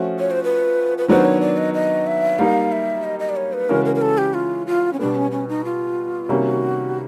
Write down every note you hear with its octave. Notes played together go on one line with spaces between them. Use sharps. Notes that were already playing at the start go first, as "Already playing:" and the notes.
Already playing: F3 A3 C#4 F#4
C#5
C5
B4
B4
D#3 F#3 B3 D4 F#4 C5
C#5
D5
D#5
D#5
E5
G3 A#3 D#4 F5
E5
D#5
D#5
D5
C#5
B4
C#3 E3 G#3 C#4 F#4 A#4
A#4
A#4
A4
G4
F4
F4
C#4
B2 G3 B3 D4
C#4
C#4
D#4
F4
C3 D#3 G3 A#3 C#4 F#4